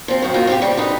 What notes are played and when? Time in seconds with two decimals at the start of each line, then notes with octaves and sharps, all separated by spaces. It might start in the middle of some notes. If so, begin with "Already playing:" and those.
0.08 F3 C4
0.22 F#2 D#3 F#5
0.34 A#3 C4 D#4 F4 F#4 A#4
0.47 C4 F4 G4
0.62 C#3 G3
0.77 D3 D#4 B4